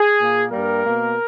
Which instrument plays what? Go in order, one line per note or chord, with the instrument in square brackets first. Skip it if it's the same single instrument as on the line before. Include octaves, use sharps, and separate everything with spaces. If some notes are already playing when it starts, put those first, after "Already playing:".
Already playing: [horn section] G#4
A#2 A#3
G2 G3 A#3 A#4
B2 A#3